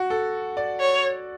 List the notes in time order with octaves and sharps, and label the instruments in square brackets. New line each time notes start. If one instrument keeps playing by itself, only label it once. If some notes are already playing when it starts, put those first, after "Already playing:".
Already playing: [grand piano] F#4
A4
D5
[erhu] C#5